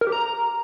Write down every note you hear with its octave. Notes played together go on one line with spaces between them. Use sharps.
A#4
G4
A#5